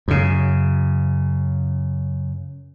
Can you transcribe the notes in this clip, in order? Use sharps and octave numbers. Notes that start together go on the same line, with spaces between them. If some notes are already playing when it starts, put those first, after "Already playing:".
F#2 C#3